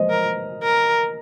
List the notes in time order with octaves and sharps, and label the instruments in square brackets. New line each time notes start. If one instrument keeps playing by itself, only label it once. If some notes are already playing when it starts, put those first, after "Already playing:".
Already playing: [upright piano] C5 D#5
[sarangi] A#4
A#4